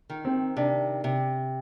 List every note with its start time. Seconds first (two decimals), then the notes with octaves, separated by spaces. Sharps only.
0.10 D#3
0.25 C4
0.57 C3 D4
1.04 C3